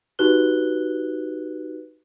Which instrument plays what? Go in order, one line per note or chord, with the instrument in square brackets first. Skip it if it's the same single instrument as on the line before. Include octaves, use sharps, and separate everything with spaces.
[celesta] D#4 F#4 G4 B4 F#6 G7